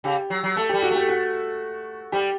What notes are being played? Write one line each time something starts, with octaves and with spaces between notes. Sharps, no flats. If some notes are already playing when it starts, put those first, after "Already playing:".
C#3 G4
F#3
F#3
A3 A4
G3 G4
F#4
A3
G4
F#4
G3 G4